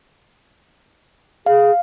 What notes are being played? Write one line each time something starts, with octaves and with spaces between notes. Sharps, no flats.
G#4 F5